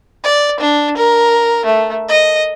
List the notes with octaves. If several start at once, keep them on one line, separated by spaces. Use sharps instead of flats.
D5
D4
A#4
A3
D#5